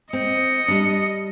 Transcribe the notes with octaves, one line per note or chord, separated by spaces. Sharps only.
C4 D#5 C#7
G3 D4